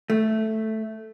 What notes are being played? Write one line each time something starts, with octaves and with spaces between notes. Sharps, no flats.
A3